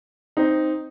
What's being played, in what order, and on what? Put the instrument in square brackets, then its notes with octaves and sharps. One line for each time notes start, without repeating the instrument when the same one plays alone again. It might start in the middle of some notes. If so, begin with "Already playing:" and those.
[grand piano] C4 D#4